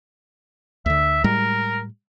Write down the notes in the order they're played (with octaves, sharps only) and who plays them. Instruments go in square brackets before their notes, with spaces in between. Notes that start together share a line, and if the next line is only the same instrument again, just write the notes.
[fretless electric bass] D2 D3 [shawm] E5
[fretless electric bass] A2 G3 G#3 [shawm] A#4